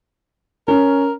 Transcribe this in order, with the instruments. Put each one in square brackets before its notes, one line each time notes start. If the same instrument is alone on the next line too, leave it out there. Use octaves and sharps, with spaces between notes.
[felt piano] C#4 [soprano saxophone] A#4